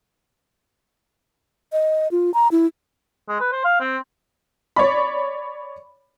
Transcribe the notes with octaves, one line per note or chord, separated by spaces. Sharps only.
D#5
F4
A#5
E4
G#3
B4
C5
F5
C4
C#5 D5 B5